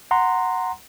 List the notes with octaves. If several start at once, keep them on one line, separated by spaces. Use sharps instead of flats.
F#5 A#5 C6